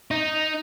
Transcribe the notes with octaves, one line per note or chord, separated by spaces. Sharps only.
D#4